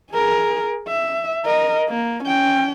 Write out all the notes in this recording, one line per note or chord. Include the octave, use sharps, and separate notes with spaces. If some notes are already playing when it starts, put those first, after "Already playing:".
G#4 A#4
E5
A#4 D#5
A#3
C#4 G5